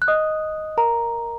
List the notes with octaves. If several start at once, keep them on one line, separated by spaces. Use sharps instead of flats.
F#6
D#5 D#6
A#4 A#5